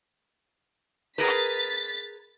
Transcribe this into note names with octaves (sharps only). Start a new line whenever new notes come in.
G#4 A#4 B4 A6 B6